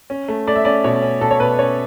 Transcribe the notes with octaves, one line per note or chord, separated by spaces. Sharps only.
C#4
A3
A3 D5
E5
C#4 D5
B2 C#5
C#4
B2 A4
C#5
B2 B4
C#4 C#5